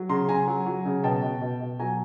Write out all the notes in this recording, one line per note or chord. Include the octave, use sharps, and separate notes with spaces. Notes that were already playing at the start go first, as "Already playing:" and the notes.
Already playing: F#3
C#3 A#5 C6
C#3 G#5 A#5
F#3
F#3
C#3
B2 G5 A5
B2
B2
B2
F#3 G#5 A#5